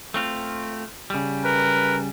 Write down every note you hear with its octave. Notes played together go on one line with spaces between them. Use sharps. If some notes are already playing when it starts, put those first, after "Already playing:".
A3 C4 F4
C#3 G3
A#4 B4